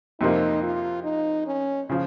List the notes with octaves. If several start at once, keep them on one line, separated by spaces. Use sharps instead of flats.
F2 C3 F3 A#3 D#4
F4
D#4
C#4
C#3 F3